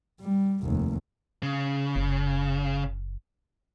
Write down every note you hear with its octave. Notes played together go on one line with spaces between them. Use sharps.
G3
F1 D#2
C#3
F#1